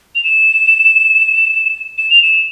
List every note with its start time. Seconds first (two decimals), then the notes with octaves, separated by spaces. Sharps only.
0.15 F7
0.24 E7
1.98 E7
2.10 F7
2.22 E7